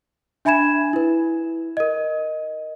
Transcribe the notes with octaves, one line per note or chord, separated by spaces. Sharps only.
D4 E5 G#5 B5 G#6 E7
E4 B4
A#4 D#5